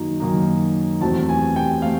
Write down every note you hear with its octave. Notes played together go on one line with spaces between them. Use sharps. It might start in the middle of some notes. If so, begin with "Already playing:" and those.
Already playing: F#2 D#3 F#3 A#3 D#4
F#2 D#3 F#3 A#3 D#4
E2 B2 F#3 A3 C4 A5
G#5
G5
A3 C4 F5